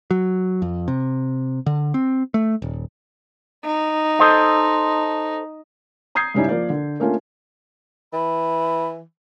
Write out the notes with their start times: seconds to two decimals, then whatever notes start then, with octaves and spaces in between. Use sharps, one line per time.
0.11 F#3
0.62 F2
0.88 C3
1.66 D3
1.94 C4
2.34 A3
2.62 D#1
3.64 D#4
4.19 A4 C5 D#5
6.15 A#5 D#6 G6 G#6 C7
6.34 G2 C#3 G3 C#4 D#4 E4
6.49 F3 A#3 A#4 D5
6.70 D3
7.00 A3 A#3 C#4 D4 F4
8.13 E3 B5